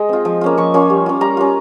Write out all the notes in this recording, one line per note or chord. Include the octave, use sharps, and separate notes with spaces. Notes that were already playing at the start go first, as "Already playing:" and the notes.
Already playing: G#3 D#5
C4 F4
F3
A#3 C#4 F4
F3 C#6
A#3 C#4 F4
G3
C#4 F4
G3 A#5
C#4 F4